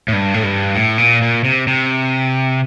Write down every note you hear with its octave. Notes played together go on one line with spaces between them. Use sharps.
A2
G2
A2
G2
A2
A#2
A#2
C3
C3